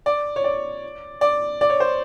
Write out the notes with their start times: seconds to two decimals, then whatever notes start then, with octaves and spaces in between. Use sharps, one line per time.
0.06 D5
0.36 C#5
0.44 D5
1.21 D5
1.61 D5
1.70 C#5
1.80 C5